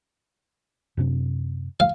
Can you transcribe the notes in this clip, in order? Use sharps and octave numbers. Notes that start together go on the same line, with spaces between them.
F#2 C3 D4
F5